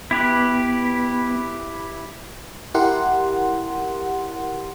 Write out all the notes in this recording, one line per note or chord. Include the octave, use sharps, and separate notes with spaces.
B3 E4 G4 B4
E4 G4 A#4 F#5 C6